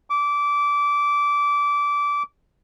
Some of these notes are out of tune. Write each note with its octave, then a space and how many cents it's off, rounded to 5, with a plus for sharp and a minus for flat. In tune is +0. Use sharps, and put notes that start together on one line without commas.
D6 -20